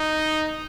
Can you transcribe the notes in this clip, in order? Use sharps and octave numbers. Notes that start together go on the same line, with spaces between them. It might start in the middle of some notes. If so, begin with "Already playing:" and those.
Already playing: D#4